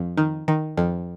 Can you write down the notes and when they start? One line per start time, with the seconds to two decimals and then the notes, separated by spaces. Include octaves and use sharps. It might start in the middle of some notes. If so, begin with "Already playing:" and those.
Already playing: F2
0.17 D#3
0.48 D#3
0.77 F2